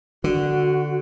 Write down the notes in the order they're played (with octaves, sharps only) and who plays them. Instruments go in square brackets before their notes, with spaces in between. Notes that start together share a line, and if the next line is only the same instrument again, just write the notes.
[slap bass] D3 [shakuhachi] F#4